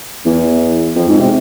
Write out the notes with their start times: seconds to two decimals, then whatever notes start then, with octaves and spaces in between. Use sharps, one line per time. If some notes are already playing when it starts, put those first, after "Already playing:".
0.26 E2
0.96 F2
1.08 G#2
1.20 C3